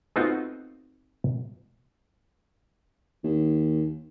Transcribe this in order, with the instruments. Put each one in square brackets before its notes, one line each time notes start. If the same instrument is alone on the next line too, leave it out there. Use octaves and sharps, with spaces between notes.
[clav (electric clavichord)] A3 B3 C4 D#4 F4 F#4
[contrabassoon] D#2